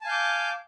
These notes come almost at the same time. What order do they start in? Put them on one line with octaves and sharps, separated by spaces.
A5 G#5 F5 G6 D6